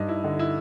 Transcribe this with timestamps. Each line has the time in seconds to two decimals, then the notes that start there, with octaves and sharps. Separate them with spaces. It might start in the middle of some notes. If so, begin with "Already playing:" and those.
Already playing: G2 D#4
0.09 E4
0.24 D3 D#4
0.39 E4